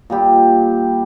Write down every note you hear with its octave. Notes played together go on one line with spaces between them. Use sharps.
A#2 G3 G4